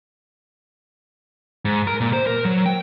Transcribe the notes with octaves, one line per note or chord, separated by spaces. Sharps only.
G#2
A#4
A#2
C5
A#4
F#3
G5